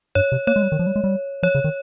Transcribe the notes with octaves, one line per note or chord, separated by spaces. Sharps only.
G2 C#5
C3
A#3 C#5
G#3
G3
D#3
F3
G3
G#3
G3
F3 C#5
C#3
D#3